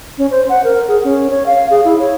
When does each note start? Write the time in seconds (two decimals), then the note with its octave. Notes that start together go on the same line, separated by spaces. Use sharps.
0.18 C#4
0.31 C5
0.49 F#5
0.64 A#4
0.88 G#4
1.04 C#4
1.30 C#5
1.46 F5
1.70 G#4
1.85 E4
1.99 C#5